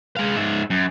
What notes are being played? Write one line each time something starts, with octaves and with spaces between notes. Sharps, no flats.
G#3 F5
G#2 E5
F#2